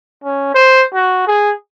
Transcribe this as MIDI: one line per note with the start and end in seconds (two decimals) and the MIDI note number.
0.24 0.51 61
0.54 0.84 72
0.94 1.25 66
1.27 1.53 68